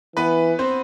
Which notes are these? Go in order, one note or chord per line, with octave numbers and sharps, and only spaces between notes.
E3 B3 B4
C4 C5